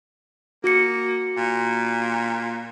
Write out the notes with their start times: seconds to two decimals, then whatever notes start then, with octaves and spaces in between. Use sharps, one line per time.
0.64 A#3 F#4 C#7
1.37 A#2